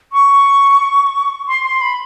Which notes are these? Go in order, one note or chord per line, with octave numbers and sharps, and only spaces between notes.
C#6
C6
C6
B5